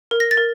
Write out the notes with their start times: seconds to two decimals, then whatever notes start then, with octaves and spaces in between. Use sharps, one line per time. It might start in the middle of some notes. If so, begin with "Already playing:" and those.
0.11 A#4
0.20 A#6
0.31 A6
0.37 A#4